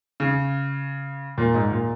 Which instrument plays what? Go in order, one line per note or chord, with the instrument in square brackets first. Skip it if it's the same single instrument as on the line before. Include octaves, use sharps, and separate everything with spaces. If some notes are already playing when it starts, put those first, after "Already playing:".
[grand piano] C#3
A#2
G#2
A#2